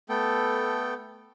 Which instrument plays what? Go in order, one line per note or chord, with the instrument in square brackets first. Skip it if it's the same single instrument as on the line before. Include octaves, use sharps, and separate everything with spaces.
[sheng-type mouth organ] A3 B3 A4 G5